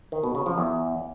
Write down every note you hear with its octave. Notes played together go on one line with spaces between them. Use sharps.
D#3
B2
C#3
F3
E2